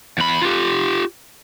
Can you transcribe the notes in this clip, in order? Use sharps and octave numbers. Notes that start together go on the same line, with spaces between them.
E2 B5
F4 G4